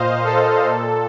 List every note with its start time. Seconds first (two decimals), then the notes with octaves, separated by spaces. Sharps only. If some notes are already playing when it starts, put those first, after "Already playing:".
Already playing: A#2 C5 D#5 F5
0.24 A4
0.65 A#2